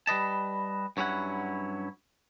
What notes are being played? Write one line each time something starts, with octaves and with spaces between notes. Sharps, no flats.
G3 B4 D#5 A5
G2 F#3 C#4 E4 F#5